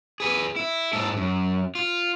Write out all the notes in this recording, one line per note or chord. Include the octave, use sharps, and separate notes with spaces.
G#4 B4
E4
G#2 A4
F#2
F4